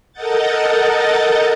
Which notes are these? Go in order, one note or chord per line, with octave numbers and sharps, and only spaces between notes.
A4 A#4 D#5 F#5 G6 A6